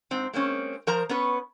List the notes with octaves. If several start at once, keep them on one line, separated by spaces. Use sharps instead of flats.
G#2 C4
G#3 A#3 C4 C#4
F3 A#4 C5 A#5
B3 C#4 B4